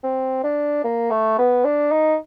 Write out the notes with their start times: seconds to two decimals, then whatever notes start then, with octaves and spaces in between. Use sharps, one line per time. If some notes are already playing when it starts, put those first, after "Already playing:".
0.04 C4
0.44 D4
0.84 A#3
1.11 A3
1.39 B3
1.65 D4
1.92 D#4